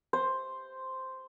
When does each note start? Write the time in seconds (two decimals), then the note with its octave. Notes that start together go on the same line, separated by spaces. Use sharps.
0.13 C5